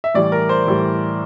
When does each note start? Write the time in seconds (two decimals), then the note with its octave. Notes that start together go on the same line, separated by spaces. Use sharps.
0.04 E5
0.15 A2 E3 G3 D5
0.32 A#4
0.49 C5
0.66 A2 E3 G3